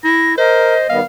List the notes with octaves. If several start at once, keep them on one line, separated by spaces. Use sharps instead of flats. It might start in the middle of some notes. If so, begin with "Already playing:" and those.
E4 A#6
A#4 C5 D#5
D#3 G3 B3 F5